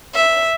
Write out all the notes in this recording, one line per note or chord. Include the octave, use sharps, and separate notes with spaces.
E5